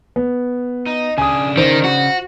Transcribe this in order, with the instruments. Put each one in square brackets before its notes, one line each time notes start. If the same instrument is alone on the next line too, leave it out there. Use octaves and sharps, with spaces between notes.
[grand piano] B3
[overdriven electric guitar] D#4
[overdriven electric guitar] C#3 D4 [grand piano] G#5 D#6
[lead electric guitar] D#3 [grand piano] C5
[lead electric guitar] F#4